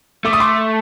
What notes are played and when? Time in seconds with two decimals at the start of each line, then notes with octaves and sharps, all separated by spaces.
0.25 A3 D6
0.33 D#6
0.40 C6 D6